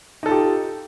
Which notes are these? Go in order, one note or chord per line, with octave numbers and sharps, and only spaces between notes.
D#4 F4 G4 A4